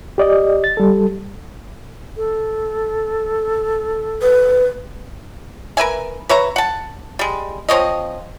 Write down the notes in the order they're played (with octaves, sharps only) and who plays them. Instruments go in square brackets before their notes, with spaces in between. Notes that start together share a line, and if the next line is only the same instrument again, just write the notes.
[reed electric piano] G4 D5 D#5
A6
G3 A4
[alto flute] A4
[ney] B4
[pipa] A#4 B4 E5 G#5
B4 C#5 E5 A#5
F#5 A5
G3 G#3
F3 C4 C#5 D#5